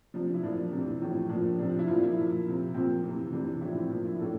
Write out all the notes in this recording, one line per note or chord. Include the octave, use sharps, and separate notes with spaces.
C3 F3 D4
E4
A#2 F3 D4
C3
E3
A2 F3
A#2 F3 D4
C3 F3 D4
D4
E4
A#2 F3 F4
E4
F3
A#2
C3 F3
A#2 F3 C4
C3 E3
C3 E3 D4
A2 F3 E4
C4
A#2 F3 D4
E4
A2 E3 A4